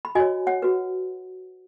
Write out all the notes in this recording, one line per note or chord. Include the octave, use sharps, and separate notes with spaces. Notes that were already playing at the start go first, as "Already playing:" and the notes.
B5
F#4 C#5 D#5 G#5
C#5 F#5
F#4 B4